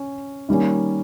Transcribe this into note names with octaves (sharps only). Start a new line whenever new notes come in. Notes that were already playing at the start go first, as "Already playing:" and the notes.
Already playing: C#4
D#3 G3 A#3 C#4